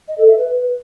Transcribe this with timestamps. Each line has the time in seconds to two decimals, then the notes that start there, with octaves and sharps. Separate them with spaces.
0.08 D#5
0.18 A4
0.28 E5
0.38 B4